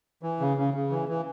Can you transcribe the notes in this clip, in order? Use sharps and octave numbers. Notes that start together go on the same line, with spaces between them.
E3
C#3
C#3
C#3
E3
E3